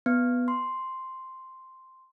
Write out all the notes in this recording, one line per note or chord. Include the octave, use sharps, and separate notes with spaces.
B3
C6